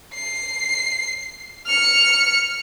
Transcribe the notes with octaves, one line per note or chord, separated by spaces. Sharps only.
C7
F6 C#7